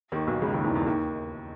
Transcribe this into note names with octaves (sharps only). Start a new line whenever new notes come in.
D#2 D#3
B1 B2
C#2 C#3
D#2 D#3
E2 E3
D#3
E2 E3
D#2 D#3